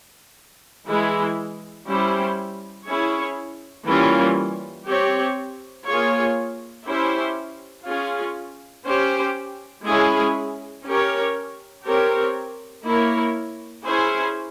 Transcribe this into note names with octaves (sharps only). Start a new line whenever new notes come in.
E3 G#3 E4 G#4
G3 C#4 E4 G4 C5
C#4 E4 G#4 C#5
E3 G3 A#3 C#4 F4
C4 G4 C#5
A#3 F4 G#4 C#5
C#4 E4 G4 C5
C#4 F4 G#4
C#4 G4 C5
G#3 C#4 E4 G#4
C#4 G4 A#4 C#5
C4 G4 A#4 C#5
A#3 E4 A#4 C#5
C#4 E4 G#4 C5